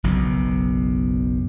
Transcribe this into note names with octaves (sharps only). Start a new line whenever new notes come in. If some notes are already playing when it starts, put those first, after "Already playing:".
F#1 B1 B2